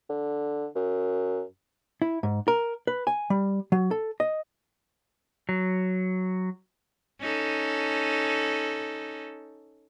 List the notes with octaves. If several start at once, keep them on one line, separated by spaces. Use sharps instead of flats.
D3
F#2
E4
G#2
A#4
B4
G#5
G3
F#3
A4
D#5
F#3
C#4 D#4 A4